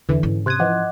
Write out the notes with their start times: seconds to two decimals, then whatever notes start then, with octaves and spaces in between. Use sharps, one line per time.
0.09 E2 D3 E3
0.23 G#2 C#4
0.46 C3 C6 D#6 F#6 G#6
0.59 E3 F3 D#5 F#5 D6